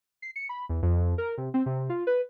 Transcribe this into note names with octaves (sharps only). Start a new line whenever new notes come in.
C7
C#7
B5
E2
F2
A#4
C3
C4
C3
F4
B4